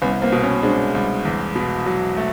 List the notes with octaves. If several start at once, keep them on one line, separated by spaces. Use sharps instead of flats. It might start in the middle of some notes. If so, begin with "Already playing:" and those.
C2 B3 C#4
A#3 C4
B2
B3 C#4
G#3 C4 D4
C2
E2
B2
F#3
A3